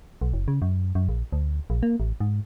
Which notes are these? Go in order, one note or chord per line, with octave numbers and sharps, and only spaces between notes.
B1
F#1
C#3
F#2
F#2
A#1
D2
A#1
A#3
A1
G#2